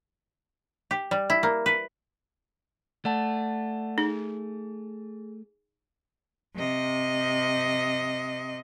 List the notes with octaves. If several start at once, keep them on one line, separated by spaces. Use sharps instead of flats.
G4
G3
E4
A#3
B4
A3 D5 F#5 A5
D#4 G#4
C3 D#5